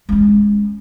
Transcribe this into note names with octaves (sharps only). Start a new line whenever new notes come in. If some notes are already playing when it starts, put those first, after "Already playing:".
G#3 C#4